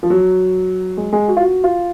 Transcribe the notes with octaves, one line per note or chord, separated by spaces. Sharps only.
F3
F#3
G#3
G#3
F#4
F4
F#4
F4